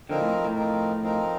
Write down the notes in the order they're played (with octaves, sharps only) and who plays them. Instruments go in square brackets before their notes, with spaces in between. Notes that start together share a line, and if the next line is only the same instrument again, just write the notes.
[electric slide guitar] D3 [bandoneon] F3 C4 D#4 A#4
[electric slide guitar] A2
A2
[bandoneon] F3 C4 D#4 A#4
F3 C4 D#4 A#4